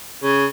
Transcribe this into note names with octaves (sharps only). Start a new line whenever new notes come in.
C#3